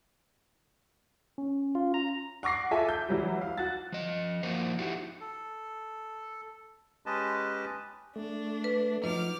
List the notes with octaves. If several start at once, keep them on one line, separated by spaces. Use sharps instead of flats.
C#4
F4
A#5
F#5 C#6 D6 A#6 C7
F4 A4 E5 G#5
G6
E3 F#3 G3
F5
F#4 A6
F3 D#5
F3 A#3 D#4 F#4 A#4 C5
D#4 E4 F#4 G4
A4
G#3 C#4 G4 B4 D#5 A5
A3 D4
B4
F3 F#3 D#4 D6 F6